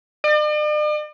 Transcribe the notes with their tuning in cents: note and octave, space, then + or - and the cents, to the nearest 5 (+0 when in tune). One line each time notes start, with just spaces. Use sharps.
D5 +45